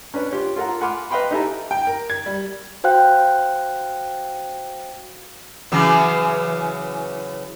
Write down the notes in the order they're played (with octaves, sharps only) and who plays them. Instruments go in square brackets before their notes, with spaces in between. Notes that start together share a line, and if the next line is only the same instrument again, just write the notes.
[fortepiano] C#4 D4 B4 C#5
F4 G4 C#5
F4 A4 A#4 F#5 A#5
F#5 G#5 B5 C6 D6 F6
B4 D#5 F5 G5 B5 C6
D#4 E4 G4 A4 G#5 A#5
[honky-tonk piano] G5
A#4
G#6
G3
[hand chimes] F#4 C5 F5 G5 F#6
[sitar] C#3 E3 F#3